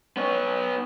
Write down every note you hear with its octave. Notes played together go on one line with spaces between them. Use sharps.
B3 C#5